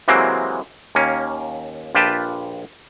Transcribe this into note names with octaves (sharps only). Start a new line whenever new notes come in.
C3 E3 F#3 G#3 A#3 C4
D#2 A#3 C#4
A#1 F4 G4 B4 G5 A5